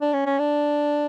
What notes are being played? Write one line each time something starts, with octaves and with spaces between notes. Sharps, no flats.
D4
C#4
C#4
D4